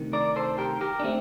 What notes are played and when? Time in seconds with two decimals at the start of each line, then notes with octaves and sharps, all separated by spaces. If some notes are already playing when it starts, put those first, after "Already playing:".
Already playing: D2 C3 D#3
0.13 A#4 D5
0.36 A4 C5
0.58 G4 A#4
0.81 G4 A#4
1.00 D4
1.03 D3 A3 C4